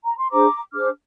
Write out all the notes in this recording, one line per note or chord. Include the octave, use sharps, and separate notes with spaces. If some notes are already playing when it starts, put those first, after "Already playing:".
A#5
C6
D4 G#4 C5 A#5 D6
D4 G#4 C5 D6 F6